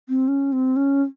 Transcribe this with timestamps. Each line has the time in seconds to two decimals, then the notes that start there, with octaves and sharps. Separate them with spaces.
0.09 C4
0.28 C#4
0.52 C4
0.76 C#4